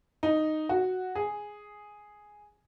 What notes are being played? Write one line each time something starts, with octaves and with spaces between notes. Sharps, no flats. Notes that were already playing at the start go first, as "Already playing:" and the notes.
D#4
F#4
G#4